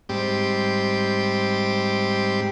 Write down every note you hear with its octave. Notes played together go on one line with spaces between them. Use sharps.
G#2 G3 C4 G4